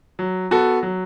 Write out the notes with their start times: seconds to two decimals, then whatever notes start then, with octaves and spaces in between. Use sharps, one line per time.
0.19 F#3
0.51 B3 F#4 A4
0.83 F#3